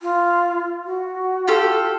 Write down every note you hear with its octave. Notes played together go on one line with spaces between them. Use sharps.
F4
F#4
F4 G4 A4